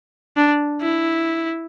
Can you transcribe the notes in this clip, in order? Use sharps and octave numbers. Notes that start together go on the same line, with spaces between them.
D4
E4